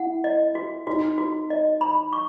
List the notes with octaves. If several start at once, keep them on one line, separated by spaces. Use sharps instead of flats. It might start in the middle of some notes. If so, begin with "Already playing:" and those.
Already playing: E4 F#5
D#5
F#4
D#4 F#4
F#4
D#5
B5
C#6